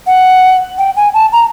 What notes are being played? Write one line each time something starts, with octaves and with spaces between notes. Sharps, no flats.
F#5
G5
G#5
A5
A#5